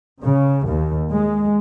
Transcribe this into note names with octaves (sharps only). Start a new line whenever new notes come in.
C#3
D#2
G#3